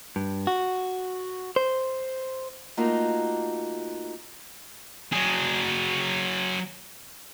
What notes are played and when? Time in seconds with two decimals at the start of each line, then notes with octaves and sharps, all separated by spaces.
0.16 G2
0.47 F#4
1.56 C5
2.77 A3 A#3 D#4 F4 F#4
5.13 F#3 G#4